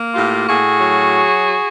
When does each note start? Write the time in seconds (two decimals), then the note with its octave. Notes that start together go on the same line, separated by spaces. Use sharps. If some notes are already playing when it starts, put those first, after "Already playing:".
Already playing: A#3
0.14 A2 F4 G4
0.47 A2 F#4 G#4
0.81 F#3